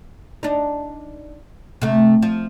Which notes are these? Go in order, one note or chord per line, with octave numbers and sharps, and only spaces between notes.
D4 D#4
C3 A3
F3